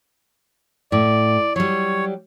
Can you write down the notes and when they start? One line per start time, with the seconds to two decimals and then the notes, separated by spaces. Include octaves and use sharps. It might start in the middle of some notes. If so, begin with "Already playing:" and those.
0.92 A2 D5
1.56 F#3 G3 C#5